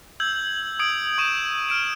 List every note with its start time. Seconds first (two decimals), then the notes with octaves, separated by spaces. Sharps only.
0.20 E6 G6 G#6 F#7
0.79 D#6 G#6 D7 F#7
1.18 C#6 G6 D#7 E7
1.69 F6 D7 E7